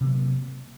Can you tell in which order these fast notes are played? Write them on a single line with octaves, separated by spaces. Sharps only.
C3 A#3 F#3